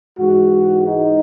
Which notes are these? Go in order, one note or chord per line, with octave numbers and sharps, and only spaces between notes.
G#2 E3 G#3 F#4
D#4